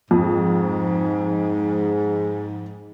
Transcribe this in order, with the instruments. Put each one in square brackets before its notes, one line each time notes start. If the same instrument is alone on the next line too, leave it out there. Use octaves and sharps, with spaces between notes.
[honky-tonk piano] F2 [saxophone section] G#2